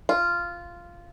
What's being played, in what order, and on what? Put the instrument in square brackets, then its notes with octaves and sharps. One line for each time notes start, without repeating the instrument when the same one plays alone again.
[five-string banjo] F4